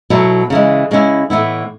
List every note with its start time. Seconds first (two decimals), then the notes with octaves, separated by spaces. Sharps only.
0.10 B2 F#3 A3 E4
0.50 C#3 E3 G#3
0.91 C#3 G#3 C#4 E4
1.30 A2 E3 B3 E4